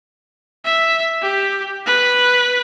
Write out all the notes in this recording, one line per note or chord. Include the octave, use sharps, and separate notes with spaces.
E5
G4
B4